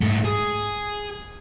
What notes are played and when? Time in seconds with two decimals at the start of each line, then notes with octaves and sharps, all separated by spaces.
0.01 G#2 A3
0.25 G#4